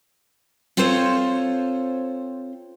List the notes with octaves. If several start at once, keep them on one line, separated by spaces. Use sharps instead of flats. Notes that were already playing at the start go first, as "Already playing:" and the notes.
C4 F4 A4 C5 C#5